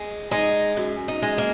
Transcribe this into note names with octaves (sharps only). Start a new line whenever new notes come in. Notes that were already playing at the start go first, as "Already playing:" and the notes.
Already playing: G#3
G#3 D#4
F#2
D#4
G#3
A#3